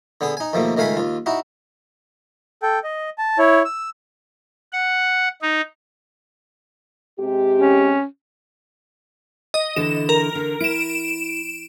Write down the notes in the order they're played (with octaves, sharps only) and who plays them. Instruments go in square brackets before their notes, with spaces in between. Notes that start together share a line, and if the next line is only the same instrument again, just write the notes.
[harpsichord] D3 B3 G#4 D#6
D#4 G#5
D#2 B2 F3 A3 A#3
C#2 D#3 A3 F5 G#5 B5
D#2 F4
D#4 E4 F#4
[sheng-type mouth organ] A4 G5
D#5
A5
E4 C#5
E6
[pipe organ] F#5
D#4
[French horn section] C3 G#3 G4
[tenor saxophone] C#4
[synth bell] D#5
[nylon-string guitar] D3 E3 A4 [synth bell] E7
[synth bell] A#4
[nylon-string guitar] D3
[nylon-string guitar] E4 [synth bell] D7 E7